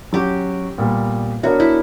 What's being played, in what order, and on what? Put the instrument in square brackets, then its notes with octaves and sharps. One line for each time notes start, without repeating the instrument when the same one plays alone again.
[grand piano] F#3 C#4 F#4 [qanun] G4
[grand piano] A#2 G3 B3
[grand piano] B3 D4 A#4 C#5 E5 [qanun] F#4
[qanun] E4